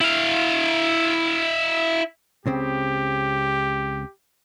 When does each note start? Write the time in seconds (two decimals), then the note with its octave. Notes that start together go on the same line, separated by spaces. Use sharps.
0.01 E4 F5
2.46 C#2 C#3 C4 G4